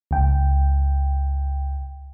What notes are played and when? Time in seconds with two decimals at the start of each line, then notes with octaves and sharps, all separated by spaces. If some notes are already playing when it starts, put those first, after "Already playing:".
0.11 C#2 G5